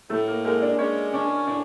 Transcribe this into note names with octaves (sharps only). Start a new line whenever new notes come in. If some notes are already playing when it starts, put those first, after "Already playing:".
A2 A3 A4
A#3 A#4
G#3 A#3 A#4
D4 D5
G#3 C#4 C#5
C#4 D4 D5
A2 D4 D5